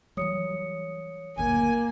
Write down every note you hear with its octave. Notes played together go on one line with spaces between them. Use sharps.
E3 F#3 G3 C#5 D#6 C#7
F#1 D2 A#2 A#3 G#5